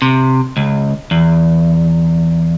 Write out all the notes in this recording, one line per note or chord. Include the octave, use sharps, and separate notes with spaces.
C3
C#2
E2